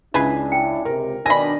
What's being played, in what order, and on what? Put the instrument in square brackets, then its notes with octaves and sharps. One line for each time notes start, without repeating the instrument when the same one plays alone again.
[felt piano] C#2 [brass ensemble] C#4 D4 E4 [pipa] G#4 B4
[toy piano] G5
[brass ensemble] C#2 C3 [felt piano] A#4
[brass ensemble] B2 D#3 D4 [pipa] G#5 B5 [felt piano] A#6